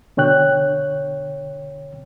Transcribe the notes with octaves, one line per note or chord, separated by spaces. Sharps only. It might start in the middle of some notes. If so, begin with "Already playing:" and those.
B2 D3 C#5 G5 F#6